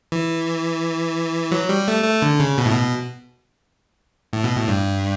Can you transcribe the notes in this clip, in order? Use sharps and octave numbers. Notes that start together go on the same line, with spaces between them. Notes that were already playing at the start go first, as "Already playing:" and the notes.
E3
F#3
G3
A3
A3
D3
C#3
B2
A2
B2
A2
B2
A2
G2